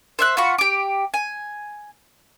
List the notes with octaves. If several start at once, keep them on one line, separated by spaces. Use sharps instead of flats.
C5 E5 F#6
F4 F#4 B5 C#6
G4 D6
G#5